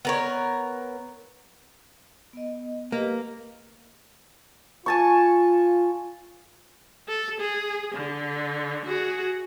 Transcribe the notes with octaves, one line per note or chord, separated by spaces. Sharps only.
B3 A#4 C#5
B3 D#5
A#3 G4 B4 D#5
F4 G#5 A5 C#6
A4
G#4
D3
F#4 G#4